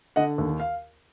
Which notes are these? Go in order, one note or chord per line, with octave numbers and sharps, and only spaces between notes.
D3 D#5 F#5
D#2
F5